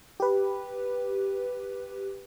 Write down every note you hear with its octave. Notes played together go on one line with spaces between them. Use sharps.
G4 B4